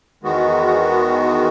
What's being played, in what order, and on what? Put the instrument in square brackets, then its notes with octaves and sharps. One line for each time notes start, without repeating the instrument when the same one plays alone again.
[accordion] E2 D#3 G#3 B3 F#4